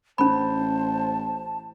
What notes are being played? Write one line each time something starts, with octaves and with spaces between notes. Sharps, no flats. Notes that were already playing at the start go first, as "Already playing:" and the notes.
A1 C#4 C5 A5 B5